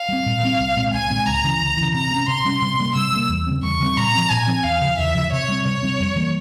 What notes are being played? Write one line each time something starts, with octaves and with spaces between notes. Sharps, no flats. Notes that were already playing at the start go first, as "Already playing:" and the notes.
Already playing: F5
G3 C4
A#2
G3 C4
C2
A#2 G#3 C4
C2 G#5
A#2 G#3 C4
C#2 A#5
C#3 E3
C#2
C#3 E3
C3 A#5
G3
C#4
C3 C6
G3 C#4
C3
G3 A#3
C3 E6
G3 A#3
E2
C#3 G3 C4
E2 C#6
C#3 G3 C4
A#2 A#5
F3 C4
A#2 G#5
F3 C4
E2 F5
C#3 F3
E2 E5
C#3 F3
C3 C#5
G3 C4
C3 C#5
G3 C4
F2
E3 G3 A#3